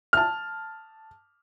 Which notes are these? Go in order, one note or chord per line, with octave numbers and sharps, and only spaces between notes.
A5 F6